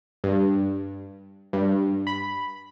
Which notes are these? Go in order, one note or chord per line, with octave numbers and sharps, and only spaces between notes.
G2
G2
B5